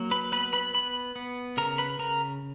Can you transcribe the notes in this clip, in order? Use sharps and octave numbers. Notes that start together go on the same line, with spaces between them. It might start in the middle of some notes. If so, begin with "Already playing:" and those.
Already playing: F#3 A#3
B4 B5
B3 B4 B5
B4 B5
B3 B4 B5
B3
C#3 A#4 A#5
B4 B5
C#3 A#4 A#5